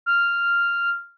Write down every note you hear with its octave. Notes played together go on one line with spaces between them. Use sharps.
F6